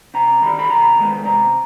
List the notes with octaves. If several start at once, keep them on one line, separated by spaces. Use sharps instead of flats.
C3 A#5
D#3 G3 B5
B5
C3 A#5
D#3 G#3 B3
C3 A#5